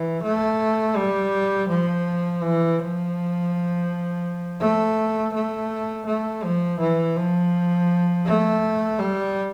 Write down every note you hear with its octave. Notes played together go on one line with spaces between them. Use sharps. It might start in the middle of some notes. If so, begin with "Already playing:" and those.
Already playing: E3
A3
G3
F3
E3
F3
A3
A3
A3
F3
E3
F3
A3
G3